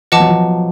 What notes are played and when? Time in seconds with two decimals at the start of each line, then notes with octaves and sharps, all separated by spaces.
0.12 F3 B4 D#5 F#5 A5 D6
0.20 F#3
0.29 F3